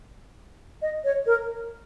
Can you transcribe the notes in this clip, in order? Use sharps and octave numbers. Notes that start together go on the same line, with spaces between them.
D#5
C#5
A#4